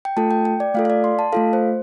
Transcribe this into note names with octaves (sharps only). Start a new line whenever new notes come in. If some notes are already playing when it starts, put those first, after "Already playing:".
G5
A3 F4 A4 A5
G5
G5
D5
A3 F4 A4 F5
F5
D5
C6
A5
A3 F4 A4 F5
C5